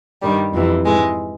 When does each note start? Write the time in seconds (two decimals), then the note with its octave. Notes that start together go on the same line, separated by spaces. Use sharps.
0.21 G2 D#3 G3
0.53 F2 C3 E3
0.85 G#2 E3 G#3